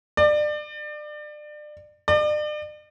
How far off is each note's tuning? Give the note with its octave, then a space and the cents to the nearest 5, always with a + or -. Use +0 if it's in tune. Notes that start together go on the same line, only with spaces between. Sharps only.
D5 +30
D5 +40